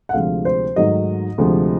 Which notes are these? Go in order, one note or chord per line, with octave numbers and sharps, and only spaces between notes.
F#5
D2 C3 F3 G#3 F5
C5
G#2 D#3 F#3 A3 D#5
D2 C3 F3 G#3